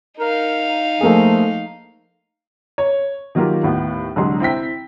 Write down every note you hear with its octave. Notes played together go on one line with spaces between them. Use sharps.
D#4 A#4 F5
F3 A3 A#3 G#4
C#5
D#3 F#3 A#3 F4 G4 A#4
D#2 A2 B3
C2 D3 F#3 G#3 C6
C4 E4 G5 B6